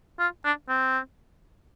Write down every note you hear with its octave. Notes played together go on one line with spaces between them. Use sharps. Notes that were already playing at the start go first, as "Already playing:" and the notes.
F4
D4
C4